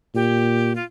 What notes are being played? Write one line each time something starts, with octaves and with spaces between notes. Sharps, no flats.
A#2 G4
F4